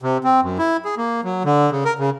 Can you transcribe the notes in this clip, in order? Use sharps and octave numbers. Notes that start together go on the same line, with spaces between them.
C3
C4
F#2
E4
G#4
A#3
F#3
D3
C#3
A#4
C#3